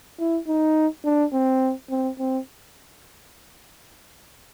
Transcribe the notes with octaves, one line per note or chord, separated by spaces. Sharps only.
E4
D#4
D4
C4
C4
C4